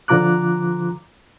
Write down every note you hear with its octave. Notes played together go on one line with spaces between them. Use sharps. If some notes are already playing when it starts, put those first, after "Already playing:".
D3 F3 F4 A#5 D6 F#6